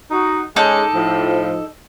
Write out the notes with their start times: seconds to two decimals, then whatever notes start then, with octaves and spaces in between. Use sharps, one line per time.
0.11 D#4 F#4
0.56 G#3 C#4 D#4 G#4 A4 D6
0.94 A2 F3